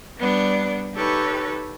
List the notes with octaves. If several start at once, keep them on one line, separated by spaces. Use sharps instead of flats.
G3 B3 D4
D#4 G4 A4 B4 C#5